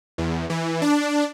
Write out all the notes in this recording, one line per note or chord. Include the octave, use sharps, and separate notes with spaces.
E2
E3
D4